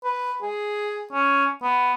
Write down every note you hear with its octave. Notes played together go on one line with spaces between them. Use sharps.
B4
G#4
C#4
B3